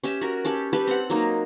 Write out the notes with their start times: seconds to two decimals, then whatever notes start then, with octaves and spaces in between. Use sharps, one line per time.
0.04 C#4 G4 E5
0.21 F#4 A#4
0.45 C#4 G4 A4 B5
0.73 G3 G4 A4 B4
0.87 C4 F#5
1.10 F#3 A#3 D#4